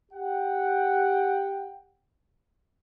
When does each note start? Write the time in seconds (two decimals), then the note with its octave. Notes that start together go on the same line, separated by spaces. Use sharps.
0.12 G4 F#5 G5